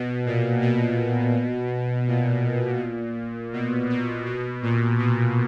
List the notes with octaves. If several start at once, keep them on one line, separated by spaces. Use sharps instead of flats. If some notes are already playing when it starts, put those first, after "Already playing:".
Already playing: B2
A#2
B2
A#2
B2
B2
B2
A#2
B2